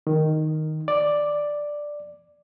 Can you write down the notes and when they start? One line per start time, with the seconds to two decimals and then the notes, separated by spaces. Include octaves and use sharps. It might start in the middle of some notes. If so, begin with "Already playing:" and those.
0.07 D#3
0.88 D5